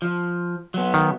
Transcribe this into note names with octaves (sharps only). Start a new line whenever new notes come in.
F3
F#3 B3
D#3